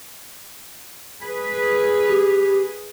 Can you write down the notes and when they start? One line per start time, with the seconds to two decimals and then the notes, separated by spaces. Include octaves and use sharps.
1.21 G#4 B4
2.09 G4